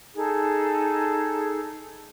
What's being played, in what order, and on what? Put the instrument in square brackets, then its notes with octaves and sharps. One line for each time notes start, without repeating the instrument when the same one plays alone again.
[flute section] D#4 G#4 A4